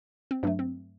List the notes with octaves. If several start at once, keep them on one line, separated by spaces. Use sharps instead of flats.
C4
G2 F#3 A3 D4
C4